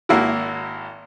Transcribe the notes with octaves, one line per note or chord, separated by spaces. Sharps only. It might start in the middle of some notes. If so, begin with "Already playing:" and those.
G#1 A#3 E4 F#4